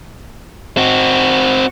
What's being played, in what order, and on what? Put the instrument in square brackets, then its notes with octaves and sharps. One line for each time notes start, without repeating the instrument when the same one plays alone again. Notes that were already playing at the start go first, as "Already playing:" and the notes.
[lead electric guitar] C4 F#4